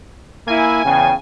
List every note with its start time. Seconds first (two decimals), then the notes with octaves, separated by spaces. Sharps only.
0.48 A#3 E4 G#5
0.84 E2 C#3 G5